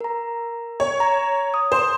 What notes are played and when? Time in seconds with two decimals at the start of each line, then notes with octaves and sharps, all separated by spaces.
0.01 A#4 A#5
0.80 C#5
1.00 A#5
1.54 D#6
1.72 C5